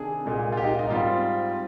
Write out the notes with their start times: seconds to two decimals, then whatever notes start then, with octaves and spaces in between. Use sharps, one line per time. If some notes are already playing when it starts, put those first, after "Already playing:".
Already playing: C3 D#3 D4 G#4
0.25 C2 A#2 G#3
0.52 F4
0.57 G4
0.64 D#4
0.69 F4
0.79 D#4
0.89 G#2 G3 C4 F4